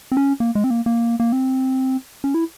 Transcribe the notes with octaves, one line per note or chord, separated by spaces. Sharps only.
C4
C#4
A#3
G#3
C4
A#3
A#3
A#3
C4
C#4
E4